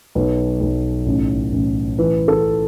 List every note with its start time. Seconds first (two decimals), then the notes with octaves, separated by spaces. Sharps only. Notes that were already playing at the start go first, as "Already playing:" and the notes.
0.15 B1 B4
0.61 B1
1.06 A1
1.52 A1
1.98 E3 B4
2.28 A4